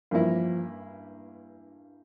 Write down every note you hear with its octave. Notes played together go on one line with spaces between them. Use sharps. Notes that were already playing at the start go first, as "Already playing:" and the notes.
G2 E3 F3 A#3 E4